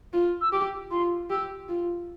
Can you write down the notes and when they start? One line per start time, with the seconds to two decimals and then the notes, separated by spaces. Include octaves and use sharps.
0.13 F4
0.41 E6
0.52 G4 D6
0.91 F4 C6
1.30 G4 E6
1.69 F4